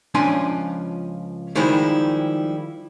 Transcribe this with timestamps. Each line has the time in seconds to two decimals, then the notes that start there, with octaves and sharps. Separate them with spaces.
0.14 C#2 F3 C#4 D4 G#5 C6
1.55 D#3 F3 G3 G#3 D#4 E4